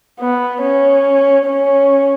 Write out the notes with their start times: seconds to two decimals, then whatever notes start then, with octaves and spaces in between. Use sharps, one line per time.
0.20 B3
0.62 C#4
1.47 C#4